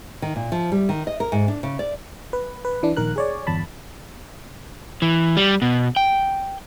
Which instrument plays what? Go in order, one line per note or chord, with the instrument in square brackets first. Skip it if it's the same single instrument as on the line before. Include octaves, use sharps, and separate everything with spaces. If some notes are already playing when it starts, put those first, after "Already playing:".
[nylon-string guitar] D#3
A#2
F3
G3
D#3
D#5
A#4
G#2
D4
C#3
D5
[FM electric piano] B4
B4
E3 D4
A#1 D#3 A#4 F#6
G#4 C#5 D5
G1 E2 A5 B5
[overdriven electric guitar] E3
G3
B2
G5